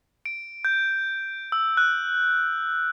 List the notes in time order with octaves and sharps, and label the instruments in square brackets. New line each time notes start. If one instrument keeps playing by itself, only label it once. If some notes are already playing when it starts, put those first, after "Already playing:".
[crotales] D7
G6
E6
F#6